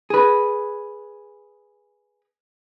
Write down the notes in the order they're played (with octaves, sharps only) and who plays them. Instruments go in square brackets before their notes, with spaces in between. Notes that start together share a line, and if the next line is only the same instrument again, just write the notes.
[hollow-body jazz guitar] G#4 B4